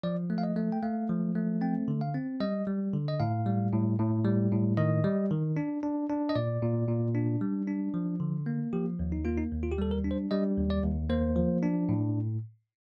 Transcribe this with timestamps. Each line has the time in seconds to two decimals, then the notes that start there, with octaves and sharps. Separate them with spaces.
0.03 F3 D5
0.30 A3
0.38 F5
0.43 D#5
0.56 A3
0.72 G5
0.83 A3 F5
1.09 F3
1.35 A3
1.61 C4 G5
1.88 D3
2.01 F5
2.14 C4
2.40 G3 D#5
2.67 G3
2.93 D3
3.08 D#5
3.20 A2 F5
3.46 G3
3.73 A2
3.99 A2
4.25 G3
4.51 A2
4.77 D#3 D#5
5.04 G3
5.31 D#3
5.57 D4
5.83 D4
6.10 D4
6.29 D#5
6.36 A#2 D5
6.62 A#2
6.88 A#2
7.15 D4
7.41 G3
7.68 D4
7.94 F3
8.20 D3
8.46 A#3
8.73 F3 G4
8.99 D#2
9.12 D#4
9.25 A#3 F4
9.38 D#4
9.52 D#2
9.63 F4
9.72 G4
9.78 G3 A4
9.91 A#4
10.04 D4
10.11 C5
10.31 G3 D#5
10.57 D#2
10.70 D5
10.83 D#2
11.10 A#3 C5
11.36 F3
11.63 D4
11.89 A2